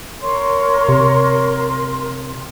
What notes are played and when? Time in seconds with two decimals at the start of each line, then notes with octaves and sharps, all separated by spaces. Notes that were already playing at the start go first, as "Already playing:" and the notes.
0.22 A#4 C#5 C6
0.89 C3